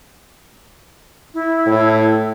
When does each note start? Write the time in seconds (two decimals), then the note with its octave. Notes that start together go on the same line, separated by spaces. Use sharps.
1.34 E4
1.67 A2